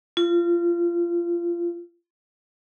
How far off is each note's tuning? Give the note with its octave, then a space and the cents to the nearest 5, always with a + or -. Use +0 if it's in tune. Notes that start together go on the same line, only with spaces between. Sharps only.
F4 -25